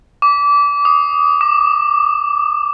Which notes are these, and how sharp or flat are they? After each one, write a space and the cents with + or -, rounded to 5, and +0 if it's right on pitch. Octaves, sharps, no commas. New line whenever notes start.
D6 -25
D#6 -10
D6 +25